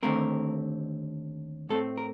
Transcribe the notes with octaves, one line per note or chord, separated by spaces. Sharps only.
D#2 D3 A3 C4 A#4
A2 A3 C4 A4
A#4